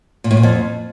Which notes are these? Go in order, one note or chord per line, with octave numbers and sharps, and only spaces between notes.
A#2
A2
A#2
F2